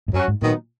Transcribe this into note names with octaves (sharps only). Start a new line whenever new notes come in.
G#2
F#2 F#3 C#4 F#4
G#2
A#2 D#3 F#3 B3 D#4